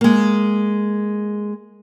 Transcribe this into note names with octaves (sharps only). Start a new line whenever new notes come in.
G#3 A#3